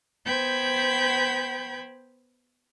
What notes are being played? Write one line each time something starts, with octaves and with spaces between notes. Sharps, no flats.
B3 C5 G5 B5 G6 G#6